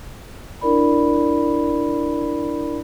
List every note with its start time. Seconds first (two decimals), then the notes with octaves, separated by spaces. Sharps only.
0.61 D4 E4 A#4 D5 B5